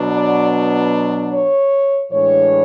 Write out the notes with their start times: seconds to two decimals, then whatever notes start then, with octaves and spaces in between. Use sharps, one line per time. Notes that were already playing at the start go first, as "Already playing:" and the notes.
Already playing: B2 F#3 B3 D4
0.13 D5
1.31 C#5
2.11 A2 E3 G#3 D4 C#5